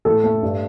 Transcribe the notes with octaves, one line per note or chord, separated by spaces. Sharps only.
A2 A4
A3
G2